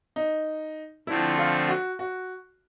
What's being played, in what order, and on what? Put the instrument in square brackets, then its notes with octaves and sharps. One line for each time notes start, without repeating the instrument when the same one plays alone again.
[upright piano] D#4
[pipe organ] D3 F3 A3 C4 [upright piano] E4
[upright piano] F4
F#4
F#4